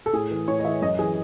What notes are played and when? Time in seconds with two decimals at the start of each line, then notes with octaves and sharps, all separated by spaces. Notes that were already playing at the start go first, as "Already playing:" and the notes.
0.06 A4
0.13 A2 G#4
0.31 E3
0.48 A2 C#5
0.59 D#5
0.65 E3 E5
0.82 F#2 D#5
0.99 E3 G#4